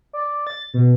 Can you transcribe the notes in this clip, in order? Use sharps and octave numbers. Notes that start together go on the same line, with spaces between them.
D5
A6
B2